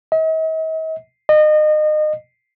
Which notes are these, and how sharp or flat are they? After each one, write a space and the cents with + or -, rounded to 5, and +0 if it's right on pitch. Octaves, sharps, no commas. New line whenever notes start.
D#5 +45
D#5 -30